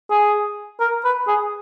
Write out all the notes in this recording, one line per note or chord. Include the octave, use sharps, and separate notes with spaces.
G#4
A#4
B4
G#4